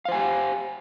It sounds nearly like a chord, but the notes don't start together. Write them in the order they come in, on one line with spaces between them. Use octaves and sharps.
F5 C5 G#5 G4